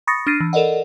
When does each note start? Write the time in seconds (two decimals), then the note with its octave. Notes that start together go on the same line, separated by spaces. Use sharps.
0.07 B5 C#6 D#6 A6 A#6 C#7
0.27 D4 F6 A6 A#6 C7 D#7
0.40 E3
0.53 A4 A#4 D5 D#5 F#5